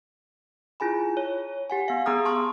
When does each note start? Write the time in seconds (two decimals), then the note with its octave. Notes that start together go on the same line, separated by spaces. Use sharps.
0.80 E4 F4 G#4 G#5 B5
1.17 C#5
1.70 G4 F#5 G#5
1.88 B3 F5
2.06 B3 G#4 A#5 D#6 F6
2.25 A5 C6 C#6 D#6 F6